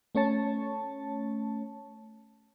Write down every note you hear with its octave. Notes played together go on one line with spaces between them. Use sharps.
A3 C#4 C#5 A5